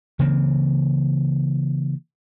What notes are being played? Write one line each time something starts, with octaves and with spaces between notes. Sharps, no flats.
C#3 E3 A#3 C4